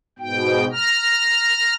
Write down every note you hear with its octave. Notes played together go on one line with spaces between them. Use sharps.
G#2 B2 G5
A#5 F6